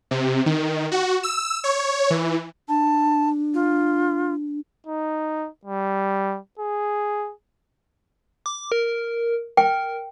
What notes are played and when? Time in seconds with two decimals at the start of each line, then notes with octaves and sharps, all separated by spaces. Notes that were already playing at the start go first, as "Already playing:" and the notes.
0.11 C3
0.46 D#3
0.92 F#4
1.23 E6
1.64 C#5
2.10 E3
2.69 D4 A5
3.54 F4
4.87 D#4
5.65 G3
6.59 G#4
8.46 D6
8.72 A#4
9.57 A#4 G5